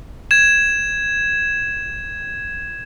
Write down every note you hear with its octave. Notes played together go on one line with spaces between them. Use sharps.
G#6 E7